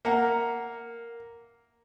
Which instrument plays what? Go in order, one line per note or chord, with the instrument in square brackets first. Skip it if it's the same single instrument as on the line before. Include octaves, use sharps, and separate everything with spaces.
[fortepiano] A#3 [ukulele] E5 F#5 A#5